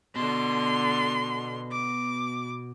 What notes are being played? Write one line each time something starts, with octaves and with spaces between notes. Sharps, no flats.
B2 D3 C6
D6